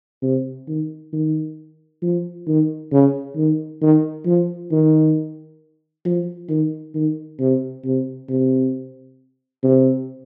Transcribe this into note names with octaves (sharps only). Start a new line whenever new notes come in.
C3
D#3
D#3
F3
D#3
C#3
D#3
D#3
F3
D#3
F3
D#3
D#3
C3
C3
C3
C3